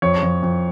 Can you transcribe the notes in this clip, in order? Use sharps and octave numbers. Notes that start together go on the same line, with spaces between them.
F2 C#5
F2
F2